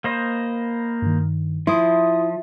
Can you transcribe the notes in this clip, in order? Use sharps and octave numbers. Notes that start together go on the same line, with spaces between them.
A#3 C5 D#5 B5
G2 D#3
F3 E4 C6 D#6